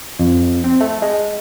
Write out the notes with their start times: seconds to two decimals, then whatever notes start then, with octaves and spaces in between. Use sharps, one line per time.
0.19 F2
0.64 C4
0.81 A3
1.02 G#3